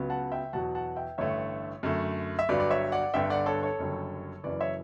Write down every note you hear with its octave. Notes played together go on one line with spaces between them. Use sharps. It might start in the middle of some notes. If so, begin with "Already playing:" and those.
Already playing: C#2 C#3 F#3 B3
F#5 A5
E5 G5
E2 B2 F#3 F#5 A5
F#5 A5
E5 G5
A1 G2 D3 A3 C#5 E5
F#2 D3 A3
E5
G1 G2 F#3 B4 D5
D5
C#5 E5
D5 F#5
G1 G2 D3 E5 G5
D5 F#5
A4 C#5
A4 C#5
F#1 F#2 D3 G3
F#1 F#2 E3 B4 D5
C#5 E5